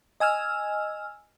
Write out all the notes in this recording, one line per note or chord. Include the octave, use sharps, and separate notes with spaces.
D#5 G#5 E6 F6